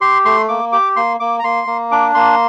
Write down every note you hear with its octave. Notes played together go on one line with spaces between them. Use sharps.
G4 C6
A3 C6
A#3 D6
G4 D6
A#3 C6
A#3 D6
A#5
A#3 C6
A#3
D4 D6
A#3 C6